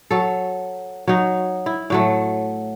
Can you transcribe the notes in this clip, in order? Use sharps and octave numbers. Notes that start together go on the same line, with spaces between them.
F#3 A4
F#3 D#4
E4
A2 F#3 A3